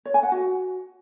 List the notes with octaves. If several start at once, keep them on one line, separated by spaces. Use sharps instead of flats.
C#5
G#5
F#5
F#4